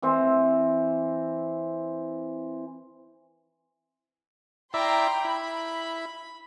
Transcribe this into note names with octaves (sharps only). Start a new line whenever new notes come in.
E3 C4
E4 D5 E5 G5 A#5 C6
E4 B5